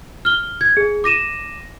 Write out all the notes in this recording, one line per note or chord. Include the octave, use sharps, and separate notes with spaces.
F6 G7
G#6
G#4
D6 A#6 D#7 E7